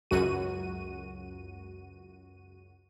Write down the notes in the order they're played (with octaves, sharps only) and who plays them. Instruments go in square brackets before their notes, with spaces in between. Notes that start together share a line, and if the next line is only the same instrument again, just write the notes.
[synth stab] C#2 F#2 F#4 D#7